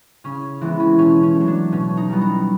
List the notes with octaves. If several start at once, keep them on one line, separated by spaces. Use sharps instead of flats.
C#3 C#4
E3 G#3 B3 C4
C#4
B2 C#4
C#4
A3
F#3
D4
B2 C#4
D#4
G3 B3
D#4